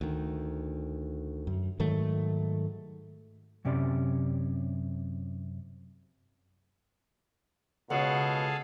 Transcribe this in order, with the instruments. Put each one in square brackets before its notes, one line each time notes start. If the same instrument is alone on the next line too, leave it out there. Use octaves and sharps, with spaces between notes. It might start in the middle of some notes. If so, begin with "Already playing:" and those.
[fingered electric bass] D2 D#3
F#2
G#2 D#3 F#3 A3
[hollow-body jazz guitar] F#2 C3 C#4 G4 D5
[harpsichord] C#2 [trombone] B2 [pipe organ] G#4 A4 F5 [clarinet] F#5